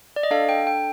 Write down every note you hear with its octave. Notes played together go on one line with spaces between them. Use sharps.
D5
D#5
D4 A4 F5
G5
G5